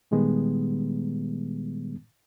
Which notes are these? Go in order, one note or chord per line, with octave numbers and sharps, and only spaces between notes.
A#2 D#3 G3 G#3 B3